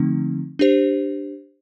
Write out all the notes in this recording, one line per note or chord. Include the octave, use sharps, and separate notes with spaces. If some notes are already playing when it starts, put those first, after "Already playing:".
Already playing: D3 F3 A3 C4 D#4
D4 G4 C5